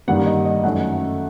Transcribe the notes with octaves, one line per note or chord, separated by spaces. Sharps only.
G2 D#3 G3 A#3 F#5
D#5
D#5
F#2 D#3 A3 F#5